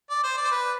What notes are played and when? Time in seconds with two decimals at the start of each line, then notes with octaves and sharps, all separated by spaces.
0.10 D5
0.24 C5
0.37 D5
0.45 C5
0.51 B4